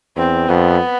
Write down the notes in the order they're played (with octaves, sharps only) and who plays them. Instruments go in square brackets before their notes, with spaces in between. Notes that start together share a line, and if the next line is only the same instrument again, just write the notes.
[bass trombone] E2 [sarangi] C4
[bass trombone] F2 [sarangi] B3